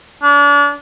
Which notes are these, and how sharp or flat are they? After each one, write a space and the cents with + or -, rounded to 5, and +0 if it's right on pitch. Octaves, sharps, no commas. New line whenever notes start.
D4 -35